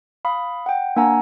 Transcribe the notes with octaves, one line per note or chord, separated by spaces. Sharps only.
F5 B5 D#6
F#5 G5
A#3 D4 F#5 G#5 A#5